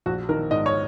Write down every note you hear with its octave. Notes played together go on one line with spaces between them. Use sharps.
A#1 F#4
D#3 A#4
G#2 D#5
C#5